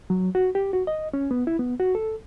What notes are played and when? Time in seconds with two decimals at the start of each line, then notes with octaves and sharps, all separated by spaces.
0.10 F#3
0.35 F#4
0.55 G4
0.73 F#4
0.87 D#5
1.14 C#4
1.31 B3
1.47 E4
1.59 B3
1.80 F#4
1.95 A4